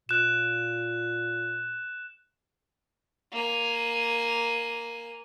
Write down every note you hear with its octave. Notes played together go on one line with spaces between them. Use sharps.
A#2 F#6 E7
A#3 G#5